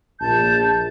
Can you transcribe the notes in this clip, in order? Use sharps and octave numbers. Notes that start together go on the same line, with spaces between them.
A#1 A5 G6